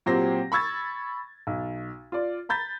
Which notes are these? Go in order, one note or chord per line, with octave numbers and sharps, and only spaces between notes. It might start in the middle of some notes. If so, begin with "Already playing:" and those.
A#2 F#3 C4 G4 C6 A#6
B5 C#6 E6 G#6 A6
B1
F4 D5
A#5 B5 G6 A6 B6